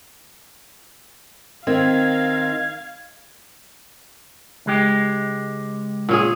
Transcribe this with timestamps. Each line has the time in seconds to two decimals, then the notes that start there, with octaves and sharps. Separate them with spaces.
1.67 D#3 C4 F5 G#6
4.66 C#2 G#3 G4
6.09 A#2 C#4 G#4